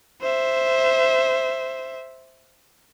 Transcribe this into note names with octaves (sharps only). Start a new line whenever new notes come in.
C5 E5